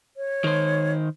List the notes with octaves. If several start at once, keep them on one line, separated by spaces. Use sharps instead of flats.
C#5
D#3 C5